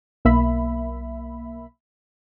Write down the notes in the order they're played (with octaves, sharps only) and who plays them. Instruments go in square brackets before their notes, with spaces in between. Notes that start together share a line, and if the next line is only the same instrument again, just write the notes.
[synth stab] B1 A#3 E5 B5